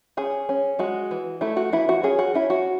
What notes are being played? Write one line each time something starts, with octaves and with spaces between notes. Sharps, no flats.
C#4 G#4
C#4
G#3 F#4
E3
A3 E4
F#4
E3 E4
F#4
C#4 G#4
F#4
C#4 E4
F#4